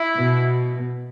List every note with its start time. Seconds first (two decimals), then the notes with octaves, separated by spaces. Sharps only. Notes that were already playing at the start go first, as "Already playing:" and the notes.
Already playing: E4
0.16 B2